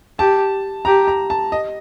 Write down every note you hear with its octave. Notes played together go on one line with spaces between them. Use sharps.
G4 A5
G4 A#5
A#5
A5
D#5